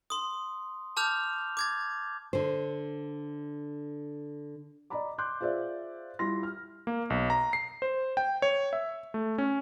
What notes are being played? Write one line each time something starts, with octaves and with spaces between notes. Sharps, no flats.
C6 D#6
A5 D6 F6 G6 F7
D6 G#6 A6
D3 C5
D5 D#5 A#5 B5 D6
C6 D6 F#6 G6
F4 G#4 C5 D5 E5
G3 E4 F4 C6 A#6
F6
A#3
B1
A#5
C7
C5
G5
C#5
E5
A3
C#4